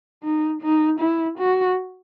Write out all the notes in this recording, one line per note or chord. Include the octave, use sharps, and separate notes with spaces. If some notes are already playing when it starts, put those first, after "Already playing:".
D#4
D#4
E4
F#4